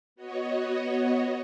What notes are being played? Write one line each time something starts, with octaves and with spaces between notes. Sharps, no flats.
B3 F#4 C#5 D#5